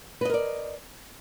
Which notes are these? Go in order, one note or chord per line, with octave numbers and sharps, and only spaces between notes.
A#4 B4 D5 D#5